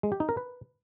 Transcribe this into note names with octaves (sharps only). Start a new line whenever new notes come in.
G#3
G4
D#4
A#4
B4